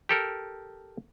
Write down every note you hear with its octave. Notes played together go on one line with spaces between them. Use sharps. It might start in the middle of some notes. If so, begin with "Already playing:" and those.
G4 A4 A#4